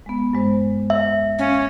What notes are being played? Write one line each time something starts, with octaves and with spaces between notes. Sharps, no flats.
G#3 B3
G2 G#3 C5
E5
A#3 C#4 F5